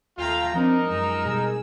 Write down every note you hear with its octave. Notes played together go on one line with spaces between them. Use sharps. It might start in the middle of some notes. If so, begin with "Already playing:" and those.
D#2 A3 F4 F5 G5 A#5
F3 C4 D4 D#4 A#4
F#2 G#3 E6
B2 G3 G#4